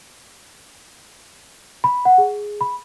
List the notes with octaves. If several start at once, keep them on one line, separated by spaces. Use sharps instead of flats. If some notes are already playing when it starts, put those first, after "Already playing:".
B5
F#5
G#4
B5